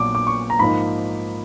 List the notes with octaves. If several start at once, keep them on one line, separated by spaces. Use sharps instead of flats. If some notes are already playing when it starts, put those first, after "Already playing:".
Already playing: A#1 A#2 F#3 B3 D4 D6
D6
C#6
A#5
G#2 F3 A#3 D#4 B5